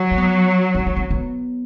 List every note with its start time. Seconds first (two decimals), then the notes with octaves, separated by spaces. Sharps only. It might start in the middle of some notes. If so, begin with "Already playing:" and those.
Already playing: F#3
0.11 C4
0.18 B3
0.74 C4
0.87 B3
0.97 C4
1.10 B3